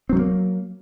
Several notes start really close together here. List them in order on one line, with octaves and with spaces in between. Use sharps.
C4 F#3 A3 A#3